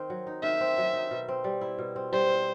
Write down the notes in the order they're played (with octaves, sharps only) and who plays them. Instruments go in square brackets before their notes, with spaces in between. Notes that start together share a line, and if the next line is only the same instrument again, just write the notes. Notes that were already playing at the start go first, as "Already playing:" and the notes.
Already playing: [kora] D#3 C4
F#3
D#4
[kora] D#3 [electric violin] E5
[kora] C4
F#3
D#4
B2
C4
G3
E4
B2
C4
[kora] G3 [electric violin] C5
[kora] E4